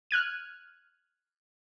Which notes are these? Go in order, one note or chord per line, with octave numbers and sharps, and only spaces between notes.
F6 F#6 G#6 D#7